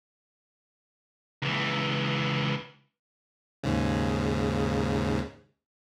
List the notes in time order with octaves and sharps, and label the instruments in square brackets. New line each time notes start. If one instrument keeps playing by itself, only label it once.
[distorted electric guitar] C#2 E3
[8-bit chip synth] D#2 G#2 C#3